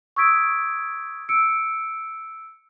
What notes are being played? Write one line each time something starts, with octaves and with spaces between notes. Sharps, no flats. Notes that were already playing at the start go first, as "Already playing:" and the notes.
C#6 D#6 E6 G#6 B6 D7
E6 C#7 D7